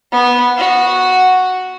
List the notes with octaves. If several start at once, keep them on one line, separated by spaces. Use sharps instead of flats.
B3
F#4